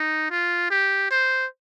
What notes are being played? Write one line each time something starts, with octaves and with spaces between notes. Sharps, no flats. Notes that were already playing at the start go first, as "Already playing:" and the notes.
Already playing: D#4
F4
G4
C5